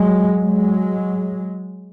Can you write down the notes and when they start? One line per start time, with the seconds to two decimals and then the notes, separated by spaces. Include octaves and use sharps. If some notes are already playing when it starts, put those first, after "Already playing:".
Already playing: F#3 G#3
0.41 F#3 G#3